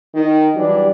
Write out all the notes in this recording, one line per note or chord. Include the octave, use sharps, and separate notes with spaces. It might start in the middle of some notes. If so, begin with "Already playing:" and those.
D#3 D#4
E3 F#3 G3 D4 G4